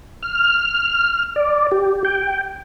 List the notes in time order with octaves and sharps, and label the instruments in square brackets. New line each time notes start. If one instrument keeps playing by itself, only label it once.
[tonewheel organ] F6
D5
G4
G5